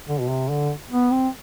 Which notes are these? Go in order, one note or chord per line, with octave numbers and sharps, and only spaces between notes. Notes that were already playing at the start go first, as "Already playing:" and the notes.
D3
B2
C3
D3
B3
C4